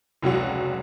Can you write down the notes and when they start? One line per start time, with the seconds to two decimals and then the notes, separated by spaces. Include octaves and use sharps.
0.22 F1 C#2 F#3 F#4